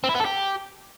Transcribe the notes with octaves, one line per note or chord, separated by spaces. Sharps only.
C4
E4
B3
A4
G4